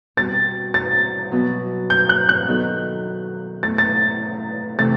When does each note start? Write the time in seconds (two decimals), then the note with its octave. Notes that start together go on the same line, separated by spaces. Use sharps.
0.17 B2 G3 C4 F#4 A6
0.74 A6
1.31 B2 F#3 B3
1.90 G6
2.09 F#6
2.29 F#6
2.48 D#3 F#3 B3 D#4 A4
3.63 B2 A3 E4 A6
3.78 A6
4.78 C3 E3 A3 E4 A6